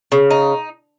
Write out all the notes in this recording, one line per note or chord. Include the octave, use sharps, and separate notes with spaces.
C#3
D#4